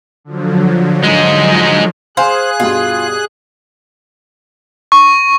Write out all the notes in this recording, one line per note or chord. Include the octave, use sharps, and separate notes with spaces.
D3 F3 F#3
G#3 D#4
G#4 C5 F5 G#5 F#6
G2 B2 F4
C#6